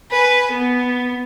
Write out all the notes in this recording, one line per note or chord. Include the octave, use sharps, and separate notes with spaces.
B4 G#5
B3